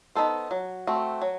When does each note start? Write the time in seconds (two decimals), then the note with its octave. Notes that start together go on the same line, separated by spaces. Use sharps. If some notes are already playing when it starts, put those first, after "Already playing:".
0.15 B3 D#4 A4 C5
0.51 F#3
0.87 A3 C4 F#4
1.22 F#3